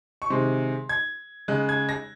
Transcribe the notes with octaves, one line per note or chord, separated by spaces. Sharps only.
C#6
C3 D#3 G#3 C6
G#6
C#3 G#3 F#6
G#6
A#6